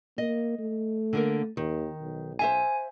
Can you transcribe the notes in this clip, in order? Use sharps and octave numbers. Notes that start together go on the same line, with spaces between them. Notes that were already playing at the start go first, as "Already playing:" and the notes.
A#3 D#5
A3
D3 A#3 A#4
D#2 D#3
B1
C5 E5 F5 G#5